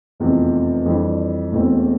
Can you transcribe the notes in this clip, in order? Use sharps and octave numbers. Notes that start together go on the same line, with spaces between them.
F1 E2 C3 F3
F2 E3 G3 D4
E1 E2 B2 A3 C4